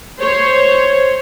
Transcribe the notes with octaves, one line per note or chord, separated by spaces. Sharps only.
C5 C#5